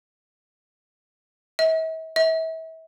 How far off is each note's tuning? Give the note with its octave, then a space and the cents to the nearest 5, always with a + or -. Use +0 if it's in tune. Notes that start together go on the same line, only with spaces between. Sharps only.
E5 -45
E5 -35